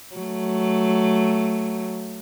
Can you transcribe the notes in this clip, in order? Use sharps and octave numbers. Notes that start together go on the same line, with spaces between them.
F#3 A3